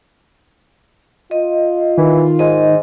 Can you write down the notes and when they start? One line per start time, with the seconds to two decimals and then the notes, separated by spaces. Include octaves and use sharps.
1.31 F4 D#5
1.97 D#3 E3
2.39 G#2 D#5